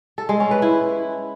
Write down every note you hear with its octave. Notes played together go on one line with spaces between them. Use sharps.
A4
G#3
C#4
B4
E4